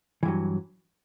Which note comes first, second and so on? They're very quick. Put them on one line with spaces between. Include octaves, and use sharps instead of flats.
E3 G2 F#3